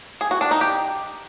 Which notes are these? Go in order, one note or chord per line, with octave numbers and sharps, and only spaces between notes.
G#4
F#4
D4
D#4
G4